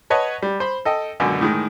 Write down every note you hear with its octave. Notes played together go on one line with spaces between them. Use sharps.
B4 C#5 D#5 F#5 A5
G3
C5 B5
A4 D#5 G5
C#2 F#2 B2 D3
A2 D#3 G#3